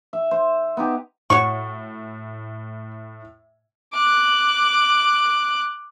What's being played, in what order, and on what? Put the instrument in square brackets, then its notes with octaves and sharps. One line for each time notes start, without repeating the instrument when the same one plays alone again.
[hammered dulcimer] E5
C5
B3 D#4 G4
[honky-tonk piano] A2 [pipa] F#4 C#5 C#6
[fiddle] D6 F#6